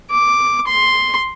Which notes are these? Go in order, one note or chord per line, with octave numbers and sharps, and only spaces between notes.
D6
C6